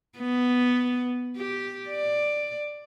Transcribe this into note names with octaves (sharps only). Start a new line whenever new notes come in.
B3
G4
D5